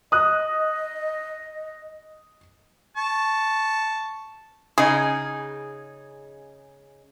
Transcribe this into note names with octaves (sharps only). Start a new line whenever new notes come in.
D#5 D#6 F#6
A5 C#6
C#3 D#4 G#4